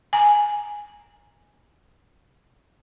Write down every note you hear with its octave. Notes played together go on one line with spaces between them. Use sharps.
G#5 A#5